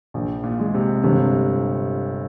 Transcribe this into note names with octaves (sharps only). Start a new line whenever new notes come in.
A#1
A#2
G#3
C3
G1 C3